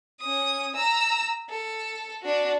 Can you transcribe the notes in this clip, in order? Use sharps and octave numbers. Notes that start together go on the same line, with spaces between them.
C#4 D#6
A#5 E6
A4
D4 F#4